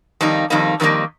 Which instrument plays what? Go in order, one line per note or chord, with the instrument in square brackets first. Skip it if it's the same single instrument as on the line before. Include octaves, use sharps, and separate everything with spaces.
[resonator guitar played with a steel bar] F2 D#3 G3 A#3 D#4
F2 D#3 G3 A#3 D#4
F2 D#3 G3 A#3 D#4